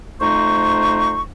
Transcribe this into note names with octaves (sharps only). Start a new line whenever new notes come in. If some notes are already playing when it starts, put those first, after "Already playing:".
F2 A3 D#4 C5 C#6